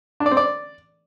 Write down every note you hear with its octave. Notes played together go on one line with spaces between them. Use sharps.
D4
D5
C4
D5